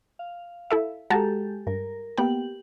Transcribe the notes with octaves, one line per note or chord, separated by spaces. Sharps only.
F5
E4 A4 E5
G#3 F#4 G4 A4 A5 A#5
G2 A#4
A#3 B3 G4 G5 F#7